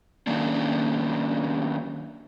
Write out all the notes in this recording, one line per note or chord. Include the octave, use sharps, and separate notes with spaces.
D#3 F#3 A#3 C#4 D4